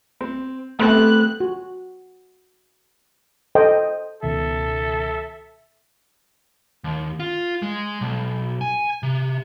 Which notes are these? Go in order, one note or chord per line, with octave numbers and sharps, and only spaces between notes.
C4
A3 B3 C4 G4 F#6
F#4
A4 C5 D#5 G5
C#2 B2 D#3 A4 E5
D#2
F4
G#3
B1
G#5
C3